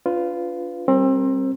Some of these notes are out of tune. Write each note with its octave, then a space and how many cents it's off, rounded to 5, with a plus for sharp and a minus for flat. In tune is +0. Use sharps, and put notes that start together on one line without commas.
D4 -30 F4 +0 B4 +20
G3 +0 C4 +30 A#4 +0